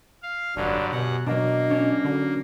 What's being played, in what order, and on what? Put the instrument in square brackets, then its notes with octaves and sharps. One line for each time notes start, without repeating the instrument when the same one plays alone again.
[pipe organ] F5
[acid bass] F1 [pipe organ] G2 D3 F#3 [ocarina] D5
[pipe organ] F#2 F#5 [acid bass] B2 [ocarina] G4
[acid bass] B2 [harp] F#3 D4 [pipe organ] A#3 [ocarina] D#5
[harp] C#4 D4
[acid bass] D3 [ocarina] F#4